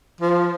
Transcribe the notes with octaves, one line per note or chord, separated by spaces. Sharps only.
F3